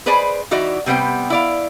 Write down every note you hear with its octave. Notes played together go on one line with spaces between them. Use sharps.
G#4 B4 C5 D5 G#5
E3 D#4 F#4 D5 E5
C3 G3 B3 C5 G5
E4 D5 F5